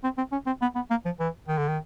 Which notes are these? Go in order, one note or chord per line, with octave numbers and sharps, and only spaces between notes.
C4
C4
C#4
C4
B3
B3
A#3
F3
E3
D#3
D3
D#3